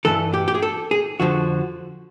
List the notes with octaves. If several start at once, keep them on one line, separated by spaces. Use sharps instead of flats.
G2 E3 A4
G4
G4
G#4
A4
G#4
F2 D3 F3 F#4